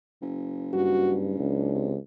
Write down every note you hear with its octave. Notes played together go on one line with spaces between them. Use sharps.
F#1
G2 F#4
C#2 D4
C3